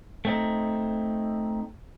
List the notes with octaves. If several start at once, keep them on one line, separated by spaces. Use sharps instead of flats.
A3 C4 D#4